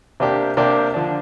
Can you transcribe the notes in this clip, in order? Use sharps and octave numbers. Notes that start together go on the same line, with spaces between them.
C3 A#3 D4 G4
C3 A#3 D4 G4
D3 F3 D4